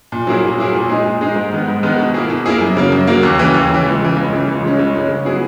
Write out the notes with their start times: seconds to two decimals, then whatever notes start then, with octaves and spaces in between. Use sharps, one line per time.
0.12 A#2
0.27 F#3 A#3 E4 G#4
0.44 A#2
0.58 F#3 A#3 E4 G#4
0.74 A#2
0.89 G#3 D#4 G#4
1.06 A#2
1.21 G#3 D#4 G#4
1.36 G#2
1.53 D#3 G#3 B3
1.68 G#2
1.83 D#3 G#3 B3
1.99 B2
2.14 A#3 E4 G#4
2.29 B2
2.46 A#3 E4 G#4
2.61 F#2
2.77 C#3 F#3 A#3
2.92 F#2
3.07 C#3 F#3 A#3
3.23 D#2
3.39 C#3 E3
3.54 D#2
3.70 C#3 E3
3.86 C#2
4.01 C#3 E3
4.17 C#2
4.32 C#3 E3
4.47 C#2
4.63 C#3 G#3 C#4
4.79 C#2
4.95 C#3 G#3 C#4
5.10 C#3
5.25 F#3 B3 E4 G#4